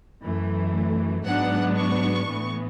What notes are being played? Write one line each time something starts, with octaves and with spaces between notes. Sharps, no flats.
F#2 E3 A3
G#2 F#3 B3 D4 F#5
C#6
A2 E3 B3